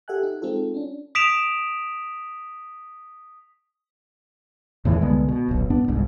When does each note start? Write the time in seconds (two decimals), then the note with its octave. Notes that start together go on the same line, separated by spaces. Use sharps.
0.08 G4 A4 E5 F#5 G#5 F#6
0.23 D#4
0.42 G#3 C4 D#4 F4 A4
0.74 C#4 D4
1.15 D#6 B6 D7 E7 F7
4.85 E2 A2 D#3 E3
5.01 C2 D3 G#3 B3
5.29 B2
5.49 D#1 B1
5.70 G2 B3 D4
5.88 G1 C2 G#2